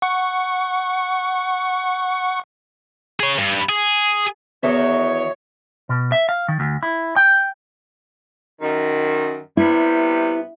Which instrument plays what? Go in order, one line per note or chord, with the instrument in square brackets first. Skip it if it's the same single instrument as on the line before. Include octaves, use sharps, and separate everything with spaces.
[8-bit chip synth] F#5 C#6
[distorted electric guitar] G#4 C#5
G2
G#4
[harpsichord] E2 [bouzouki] D#3 F#4 E5 [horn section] C#5
[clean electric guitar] B2
E5
F5
D#3
D2
E4
G5
[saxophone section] F#2 D#3
[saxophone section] C3 G3 B3 [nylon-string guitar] E4